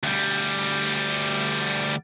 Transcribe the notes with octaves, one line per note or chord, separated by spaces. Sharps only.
D2 G3